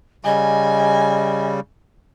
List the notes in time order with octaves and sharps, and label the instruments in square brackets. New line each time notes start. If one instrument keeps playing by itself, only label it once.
[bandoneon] C#3 G3 [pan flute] D#5 [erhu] G#5